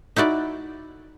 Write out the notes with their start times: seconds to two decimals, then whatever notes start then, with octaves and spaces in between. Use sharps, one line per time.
0.16 D#4 E4 F#4 D5